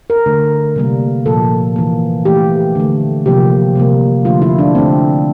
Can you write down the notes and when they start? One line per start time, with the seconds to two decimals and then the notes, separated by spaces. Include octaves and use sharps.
0.10 A#4
0.26 D3 A3
0.76 C3 G3 A#3
1.26 A#2 F3 A#3 A4
1.76 E3 A#3
2.25 E3 A3 G4
2.75 D3 A3
3.26 C3 F3 A#3 G4
3.75 C3 G3 A#3
4.25 D3 F3 A3 F4
4.42 E4
4.59 D4
4.75 D3 A3 C4